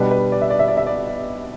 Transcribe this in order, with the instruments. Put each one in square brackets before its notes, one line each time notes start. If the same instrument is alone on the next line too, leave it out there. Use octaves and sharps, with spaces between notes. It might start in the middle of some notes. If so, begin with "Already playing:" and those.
Already playing: [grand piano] B2 G3 D4 [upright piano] B4
[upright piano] B4
D5
E5
D5
E5
D5
E5
D5